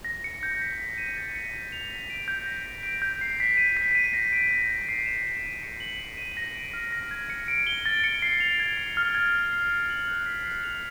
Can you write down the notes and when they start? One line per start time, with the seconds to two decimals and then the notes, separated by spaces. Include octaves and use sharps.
0.05 A#6
0.24 C#7
0.43 G6
0.61 B6
0.80 B6
0.98 D#7
1.17 A6
1.35 C#7
1.54 C#7
1.72 F7
1.90 B6
2.10 D7
2.28 G6
2.46 A#6
2.66 B6
2.83 D7
3.02 G6
3.21 C7
3.40 B6
3.57 D#7
3.77 B6
3.95 D#7
4.13 A#6
4.33 D7
4.51 G6
4.70 A#6
4.89 C7
5.06 E7
5.26 C7
5.43 D#7
5.63 C#7
5.80 F#7
6.00 B6
6.17 D#7
6.37 A#6
6.55 D7
6.73 F6
6.92 A#6
7.11 G#6
7.30 C#7
7.48 D7
7.67 G7
7.86 A6
8.04 C#7
8.22 C7
8.40 F7
8.60 G#6
8.77 C7
8.97 F6
9.15 G#6
9.33 G#6
9.53 C7
9.71 C#7
9.90 F#7
10.08 F#6
10.26 B6
10.46 C7
10.63 F7